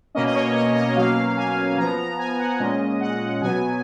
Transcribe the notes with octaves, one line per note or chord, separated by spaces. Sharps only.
B2 A#3 C#4 D#5
D#5
C#5
D#5
D#5
B2 F#3 A#3 C#4 F5
G#5
F3 B3 A#5
A#5
G#5
F#5
A#2 G#3 C#4 D#5
F#5
B2 F#3 B3 G#5